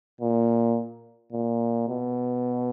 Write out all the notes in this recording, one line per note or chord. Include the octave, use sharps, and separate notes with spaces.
A#2
A#2
B2